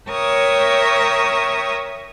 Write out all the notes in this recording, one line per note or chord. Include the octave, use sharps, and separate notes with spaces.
A#4 C#5 E5 G5 C#6 D#6